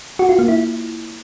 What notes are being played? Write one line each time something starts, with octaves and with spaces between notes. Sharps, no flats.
F#4
F4
A#3
E4